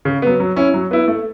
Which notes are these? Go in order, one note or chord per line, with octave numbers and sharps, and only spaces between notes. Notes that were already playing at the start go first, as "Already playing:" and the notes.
C#3
F#3 B3
F#3
C#4 E4
F#3
B3 E4
A3